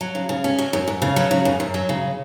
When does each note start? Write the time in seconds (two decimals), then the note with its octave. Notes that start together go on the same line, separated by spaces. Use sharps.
0.01 F#3
0.15 C#3
0.29 C#3
0.44 C#4
0.59 F#3
0.73 F#2
0.88 F#2
1.02 C#3
1.16 F#3
1.31 C#3
1.45 F#2
1.60 F#2
1.74 F#3
1.89 C#3